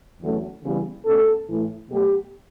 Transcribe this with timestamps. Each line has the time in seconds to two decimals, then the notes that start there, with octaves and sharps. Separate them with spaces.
0.21 E2 D3 F#3 A3 C#4
0.63 C#3 E3 G3 B3
1.05 B2 A3 C#4 A4
1.48 A2 E3 A3
1.89 B2 F#3 A3 G4